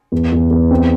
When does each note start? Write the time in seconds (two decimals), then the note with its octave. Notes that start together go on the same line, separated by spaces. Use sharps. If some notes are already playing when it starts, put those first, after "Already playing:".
0.12 E2
0.32 E2
0.51 E2
0.71 C4